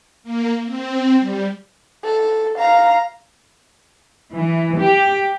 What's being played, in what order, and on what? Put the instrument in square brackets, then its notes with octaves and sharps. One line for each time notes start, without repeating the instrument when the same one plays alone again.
[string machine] A#3
C4
G3
[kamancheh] A4
F5 A#5
[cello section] E3
G4